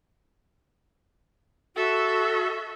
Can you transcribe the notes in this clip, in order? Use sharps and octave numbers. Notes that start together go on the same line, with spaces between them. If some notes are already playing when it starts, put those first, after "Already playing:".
F#4 A4 E5